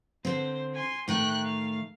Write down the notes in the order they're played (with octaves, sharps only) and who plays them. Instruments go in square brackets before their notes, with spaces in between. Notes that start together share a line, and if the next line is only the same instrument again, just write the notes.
[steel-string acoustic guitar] D3 C4 [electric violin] C5
[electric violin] G#5 C6
[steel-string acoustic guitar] A2 D#3 A3 [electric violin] G5 F#6
[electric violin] F5